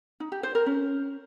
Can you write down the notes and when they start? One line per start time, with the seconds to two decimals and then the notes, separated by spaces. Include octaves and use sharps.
0.20 D#4
0.32 G4
0.43 C5
0.55 A#4
0.66 C#4